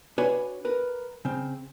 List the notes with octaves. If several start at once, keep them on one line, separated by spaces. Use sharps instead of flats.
D4 F#4 B4 C#5 G#5
A#4 B4
C#3 C4